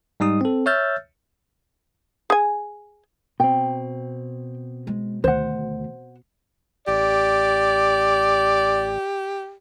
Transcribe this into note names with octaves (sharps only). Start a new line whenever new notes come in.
G#2 G3 D#4 D#6
C4 A4
C#5 E5 E6 F6 G6 A6
G#4 G#5
B2 C4 G5
G#3
D2 D#3 C5 F#5
A1 G4 D5